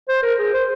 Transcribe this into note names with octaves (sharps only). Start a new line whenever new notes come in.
C5
A#4
G#4
C5